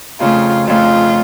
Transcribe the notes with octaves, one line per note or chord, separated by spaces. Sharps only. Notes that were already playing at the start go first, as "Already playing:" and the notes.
F2 C#3 A3 F4
F2 C#3 A3 F4